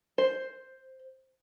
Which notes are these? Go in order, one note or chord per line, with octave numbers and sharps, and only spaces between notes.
C5